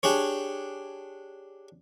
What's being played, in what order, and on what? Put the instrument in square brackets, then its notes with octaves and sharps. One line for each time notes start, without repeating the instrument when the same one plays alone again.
[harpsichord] D4 G4 G#4 C#5